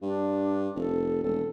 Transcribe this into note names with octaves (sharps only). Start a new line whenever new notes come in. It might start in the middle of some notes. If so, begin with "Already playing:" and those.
G2 D4
F1 A4
E1 A4